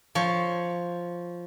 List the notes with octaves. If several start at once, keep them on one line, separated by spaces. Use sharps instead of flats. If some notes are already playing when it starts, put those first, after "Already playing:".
F3 C#5